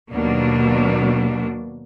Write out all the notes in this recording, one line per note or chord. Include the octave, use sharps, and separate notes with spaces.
D#2 B2 F#3 A#3 D4